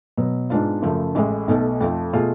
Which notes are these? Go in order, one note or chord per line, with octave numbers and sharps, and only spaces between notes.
B2 F#3 B3
G#2 G#3 B3 D4 F4
F#2 C#3 F3 A3
A1 A2 G#3
B1 B2 A3
F2 F3 A3
B2 A3 F4 G#4